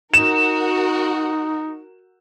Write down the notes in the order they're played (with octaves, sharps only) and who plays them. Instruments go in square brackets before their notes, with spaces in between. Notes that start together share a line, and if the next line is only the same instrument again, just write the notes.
[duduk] D#4 [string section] F#4 A#4 [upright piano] E7